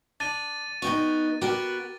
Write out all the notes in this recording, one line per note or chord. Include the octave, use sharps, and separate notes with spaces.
D4 A6 D#7
B3 D#4 F#4 G5
B3 F#4 G4 A#4 G5